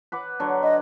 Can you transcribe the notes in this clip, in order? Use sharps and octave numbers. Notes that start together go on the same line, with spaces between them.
B4 F#5 D6
D3 F#3
B4 D#5